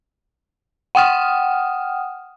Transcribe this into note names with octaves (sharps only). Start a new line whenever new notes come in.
F#5 G5 D#6 F6